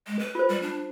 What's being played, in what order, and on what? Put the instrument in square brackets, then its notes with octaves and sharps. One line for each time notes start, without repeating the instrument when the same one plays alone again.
[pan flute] G#3
B4
[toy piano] F4 C5
[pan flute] G3
D4